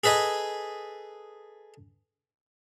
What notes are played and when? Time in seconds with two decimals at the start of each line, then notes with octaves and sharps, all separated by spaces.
0.04 G#4 A4 B4 D#5 G#5